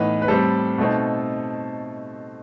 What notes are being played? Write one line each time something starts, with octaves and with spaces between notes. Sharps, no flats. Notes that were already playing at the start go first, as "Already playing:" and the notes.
Already playing: A2 E3 B3 D#4 B4
B4
A2 G3 C4 A4
B2 A3 C4 D#4